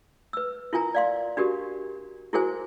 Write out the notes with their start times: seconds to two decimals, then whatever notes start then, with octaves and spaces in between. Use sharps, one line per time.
0.33 B4 E6
0.73 E4 F4 A#4 G#5 A#5
0.95 D5 F5 C6
1.37 D4 F#4 G4 A#4
2.33 E4 F#4 G#4 A#4 C5 G#5